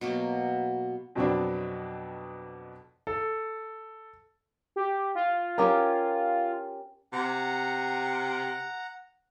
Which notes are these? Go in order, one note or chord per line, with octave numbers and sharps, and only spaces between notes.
B2 F#3 A#3 A5
F2 B2 F#3 B3 C4 D4
A4
G4
F4
C#4 G4 A#4
C3 F#5 A#5